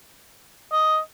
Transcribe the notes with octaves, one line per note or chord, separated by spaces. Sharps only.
D#5